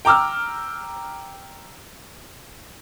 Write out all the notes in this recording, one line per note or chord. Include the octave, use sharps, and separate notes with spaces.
G5 A#5 D6 E6 F6